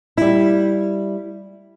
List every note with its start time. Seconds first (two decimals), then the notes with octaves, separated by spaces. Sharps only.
0.17 G3 E4